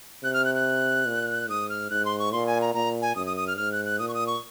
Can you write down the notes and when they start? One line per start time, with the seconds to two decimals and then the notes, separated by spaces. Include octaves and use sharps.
0.24 C3 F#6
0.34 F6
0.45 F#6
0.55 F#6
1.07 A#2
1.49 G#2 D#6
1.69 F6
1.90 G#2 F#6
2.05 C6
2.19 C#6
2.32 A#2 C6
2.47 G#5
2.61 A#5
2.75 A#2 A#5
3.02 G#5
3.16 F#2 D#6
3.26 D#6
3.37 D#6
3.47 F6
3.57 G#2 F6
3.72 F#6
3.85 F#6
3.99 A#2 D#6
4.08 C#6
4.14 D#6
4.27 C#6